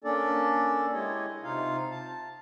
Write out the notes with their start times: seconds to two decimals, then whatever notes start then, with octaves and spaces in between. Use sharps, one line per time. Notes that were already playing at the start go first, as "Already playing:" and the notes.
0.04 A#3 C#4 D4 A4 D5
0.93 G#3 E4 G4 C#5 D#5
1.43 C3 D#4 F4 F5
1.91 A5